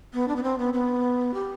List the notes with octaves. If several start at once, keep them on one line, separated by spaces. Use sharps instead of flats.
B3
D4
B3
C4
B3
B3
G4